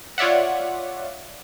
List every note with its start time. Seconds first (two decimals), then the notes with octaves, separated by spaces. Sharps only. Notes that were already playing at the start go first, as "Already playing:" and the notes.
0.18 F4 C#5 D5 E5 F#5